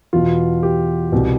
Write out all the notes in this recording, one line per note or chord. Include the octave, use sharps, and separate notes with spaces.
E2 B2 F4
G4
C2 B2